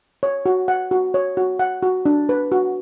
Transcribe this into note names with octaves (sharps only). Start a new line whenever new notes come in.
C#5
F#4
F#5
F#4
C#5
F#4
F#5
F#4
D4
B4
F#4